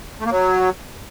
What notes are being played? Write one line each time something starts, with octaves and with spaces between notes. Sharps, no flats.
A3
A#3
F#3